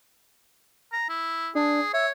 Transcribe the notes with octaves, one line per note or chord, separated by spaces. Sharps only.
A#5
E4
D4 G#4
C#5 E5